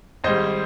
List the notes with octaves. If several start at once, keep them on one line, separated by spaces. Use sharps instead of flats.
G#1 G#2 G3 C5 D#5